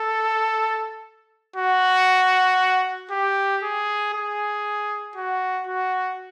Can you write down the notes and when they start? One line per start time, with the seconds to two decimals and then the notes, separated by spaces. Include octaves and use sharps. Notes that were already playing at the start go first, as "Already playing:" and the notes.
Already playing: A4
1.57 F#4
3.11 G4
3.63 G#4
4.14 G#4
5.16 F#4
5.67 F#4